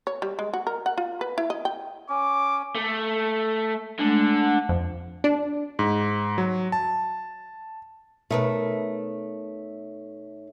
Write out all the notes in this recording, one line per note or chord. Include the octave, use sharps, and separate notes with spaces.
C#5
G3
G#3
F#4
A#4
F#5
F4
B4
E4
D#5
G5
C#4 D6
A3
D3 G#3 A3
F2
D4
G#2
F#3
A5
B2 A3 D#4 A#4 B4 C#5